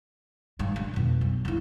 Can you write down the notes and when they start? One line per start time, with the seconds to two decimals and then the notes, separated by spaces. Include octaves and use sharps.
0.59 G2
0.76 D3
0.94 F2 B2
1.21 B1
1.45 C#3 E4